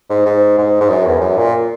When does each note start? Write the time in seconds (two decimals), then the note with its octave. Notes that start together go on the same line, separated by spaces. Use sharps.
0.10 G#2
0.26 G#2
0.58 G#2
0.81 G#2
0.89 F#2
1.06 E2
1.21 F#2
1.37 A#2